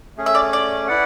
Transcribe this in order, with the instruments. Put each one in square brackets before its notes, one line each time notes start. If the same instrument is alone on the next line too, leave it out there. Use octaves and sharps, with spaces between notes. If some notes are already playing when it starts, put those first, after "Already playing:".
[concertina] A3 C#4 G#4
[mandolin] E5
D5
D5
[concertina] E4 B4 D5 F#5